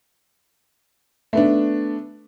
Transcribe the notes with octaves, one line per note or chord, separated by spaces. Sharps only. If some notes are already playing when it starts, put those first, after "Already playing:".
A3 B3 D4